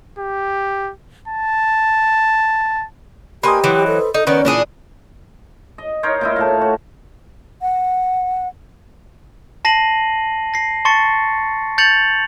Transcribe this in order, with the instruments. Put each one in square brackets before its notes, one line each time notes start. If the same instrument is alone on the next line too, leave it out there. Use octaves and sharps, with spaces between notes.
[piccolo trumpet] G4
A5
[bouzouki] A#3 G#5 [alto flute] G4 [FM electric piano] B4 C5 D#5
[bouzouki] E3 F#3
[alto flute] A4
[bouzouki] D#4 [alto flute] A4
[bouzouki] D#3 B3 D5 [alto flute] C#4 [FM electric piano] B4
[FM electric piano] A#2 [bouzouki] E3 D4 G#4
[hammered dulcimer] D#5
D#4 A#4 C5 C#5
A#2 D#4 E4
A2 F5 A5
F#4
[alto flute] F#5
[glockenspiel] A5 A#6 C7 D#7 F#7
A#6 C7
A5 C6 C#6 A6 C#7
G6 A6 C#7 F7 F#7